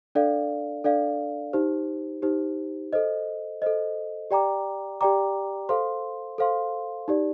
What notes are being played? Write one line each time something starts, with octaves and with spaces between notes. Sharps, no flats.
D4 A4 D5 F5
D4 A4 D5 F5
D#4 G4 C5
D#4 G4 C5
A4 C5 D#5
A4 C5 D#5
G4 D5 G5 A#5 D6
G4 D5 G5 A#5 D6
A4 C5 F5 C6
A4 C5 F5 C6
D#4 G4 D5